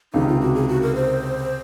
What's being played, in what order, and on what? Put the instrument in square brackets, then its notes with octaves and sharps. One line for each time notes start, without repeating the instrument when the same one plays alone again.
[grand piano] C#2 C3 D#3 [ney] D#4
[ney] F4
F#4
G#4
F#4
A#4
C5